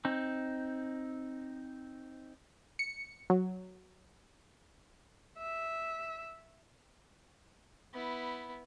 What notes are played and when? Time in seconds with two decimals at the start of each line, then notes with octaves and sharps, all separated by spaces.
0.05 C4 D#4
2.79 C#7
3.30 F#3
5.38 E5
7.93 B3 E4